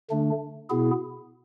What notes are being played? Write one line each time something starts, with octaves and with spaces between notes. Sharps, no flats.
D3 A3 D4
B2 B3 E4 G#4